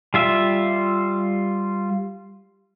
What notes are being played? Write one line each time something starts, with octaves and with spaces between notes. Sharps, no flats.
G3 F4 E5